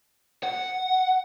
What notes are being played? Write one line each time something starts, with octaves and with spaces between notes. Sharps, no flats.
F#5